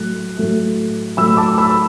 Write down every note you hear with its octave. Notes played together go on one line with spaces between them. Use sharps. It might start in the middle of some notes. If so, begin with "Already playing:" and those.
Already playing: A2 F#3 A3 F#6
A2 F#3 A3
A2 F#3 A3 B5 E6
A5 D6
B5 E6